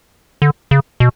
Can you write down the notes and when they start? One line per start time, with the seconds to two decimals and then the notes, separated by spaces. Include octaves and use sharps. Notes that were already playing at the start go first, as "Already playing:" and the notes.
0.42 D3
0.71 C#3
1.00 B2